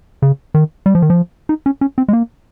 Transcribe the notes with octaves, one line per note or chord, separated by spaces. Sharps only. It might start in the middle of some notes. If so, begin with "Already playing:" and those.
C#3
D#3
G3
F3
D#3
F3
D#4
C#4
C#4
C4
G#3
A#3